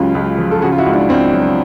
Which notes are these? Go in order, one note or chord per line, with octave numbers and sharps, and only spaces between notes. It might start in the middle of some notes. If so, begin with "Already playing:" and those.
Already playing: C#2 C#3 F#3 F4 G4
C#2
F3
A4
C#3 F#4 G#4
F4
E4 F#4
C#2
D4 E4
C#2 C4 D4
F#3